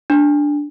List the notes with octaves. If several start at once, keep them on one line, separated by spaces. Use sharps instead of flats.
D4